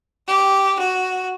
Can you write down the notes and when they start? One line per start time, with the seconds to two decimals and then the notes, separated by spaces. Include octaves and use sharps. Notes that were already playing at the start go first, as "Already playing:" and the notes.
0.28 G4
0.79 F#4